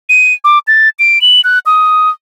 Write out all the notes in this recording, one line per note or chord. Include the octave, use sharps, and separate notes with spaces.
D#7
D6
A6
D7
F#7
F#6
D#6